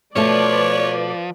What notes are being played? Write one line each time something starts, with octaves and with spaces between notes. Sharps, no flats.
B2 F3 A3 B4 C#5 D5